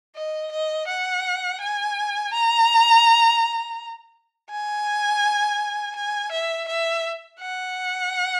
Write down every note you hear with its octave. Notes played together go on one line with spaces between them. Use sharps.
D#5
D#5
F#5
G#5
A#5
G#5
G#5
E5
E5
F#5